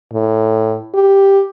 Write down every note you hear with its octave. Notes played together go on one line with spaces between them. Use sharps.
A2
G4